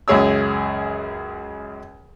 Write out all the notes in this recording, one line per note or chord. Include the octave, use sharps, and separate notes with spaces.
C#2 F#2 C#3 G#4 C#5 E6